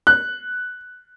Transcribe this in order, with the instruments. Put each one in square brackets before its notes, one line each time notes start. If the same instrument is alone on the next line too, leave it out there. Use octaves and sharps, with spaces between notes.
[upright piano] F#6